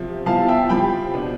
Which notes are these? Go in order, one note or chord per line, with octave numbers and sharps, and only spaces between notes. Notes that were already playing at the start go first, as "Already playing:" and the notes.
Already playing: C3 F3 C4
F3 B3 E4 F5 A5
E5 G5
F3 C4 G4 G5 B5
B2 B3 D4